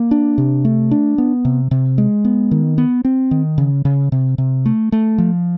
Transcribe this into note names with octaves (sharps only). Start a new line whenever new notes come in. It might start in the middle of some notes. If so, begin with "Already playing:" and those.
Already playing: A#3
D4
C3
A3
D4
B3
C3
C3
G#3
B3
D#3
B3
C4
D#3
C#3
C#3
C3
C3
A3
A3
F3